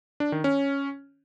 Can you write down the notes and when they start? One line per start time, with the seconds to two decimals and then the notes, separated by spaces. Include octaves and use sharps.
0.20 D4
0.32 D#3
0.44 C#4